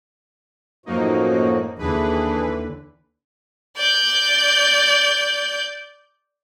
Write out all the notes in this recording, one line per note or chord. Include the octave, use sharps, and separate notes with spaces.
F#2 A2 F3 A#3 D#4 F#4
D#2 D3 E3 D4 E4 G#4 B4
D5 G6